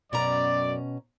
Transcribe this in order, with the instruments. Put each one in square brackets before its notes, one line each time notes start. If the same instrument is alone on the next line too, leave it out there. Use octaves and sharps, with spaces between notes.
[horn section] F#2 D5 [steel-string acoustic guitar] B2 C#4 A#5